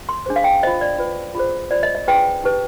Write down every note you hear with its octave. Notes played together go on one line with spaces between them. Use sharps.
C6
D4 G#4 C5
F5
G5
F4 C5 D#5
D5
F4 B4
F4 G#4 C5
F4 C5 D5
D#5
D#5
D4 F4 G#4 B4 G5
D#4 G4 B4